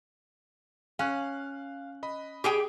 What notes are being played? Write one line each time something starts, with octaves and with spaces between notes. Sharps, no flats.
C#4 F5 F#6
D#5 B5
G4 G#4 G5